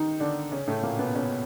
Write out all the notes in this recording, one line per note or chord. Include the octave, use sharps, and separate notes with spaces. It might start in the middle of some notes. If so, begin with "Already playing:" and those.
Already playing: D#3 D#4
D3 D4
C#3 C#4
A2 A3
A#2 A#3
B2 B3
C#3 C#4